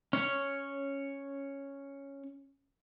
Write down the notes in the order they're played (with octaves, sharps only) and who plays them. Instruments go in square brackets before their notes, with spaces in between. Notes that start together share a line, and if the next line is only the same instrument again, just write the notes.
[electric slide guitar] C#4 C#5